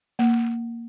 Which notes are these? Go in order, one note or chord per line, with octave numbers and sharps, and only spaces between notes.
A#3